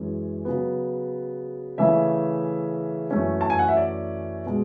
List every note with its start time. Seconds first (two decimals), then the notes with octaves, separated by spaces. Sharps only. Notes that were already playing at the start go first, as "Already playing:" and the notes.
Already playing: F#2 E3 G#3 C#4
0.45 C#3 F#3 B3
1.78 C#3 E3 A3 C#4 E5
3.11 F#2 E3 A3 C#4
3.41 A5
3.50 G#5
3.59 F#5
3.68 E5
3.77 D5
4.46 B2 G#3